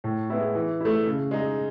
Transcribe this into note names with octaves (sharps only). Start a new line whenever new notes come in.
A2
G#3 B3 E4
E3
A3 E4
C#3
G#3 D#4